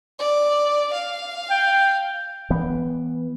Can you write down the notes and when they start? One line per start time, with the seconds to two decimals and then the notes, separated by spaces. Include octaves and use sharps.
0.19 D5
0.93 F5
1.50 G5
2.50 E3 B3